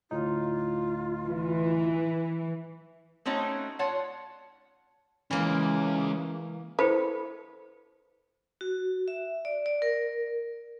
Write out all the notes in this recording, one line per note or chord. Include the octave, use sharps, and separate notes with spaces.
D2 A2 D#4 F4
E3
A3 C4 C#4 D#4 F#4
F4 C#5 F#5 A5
E3 G#3 A#3 C#4
E4 A4 B4 C5
F#4
E5
D5
D5
A#4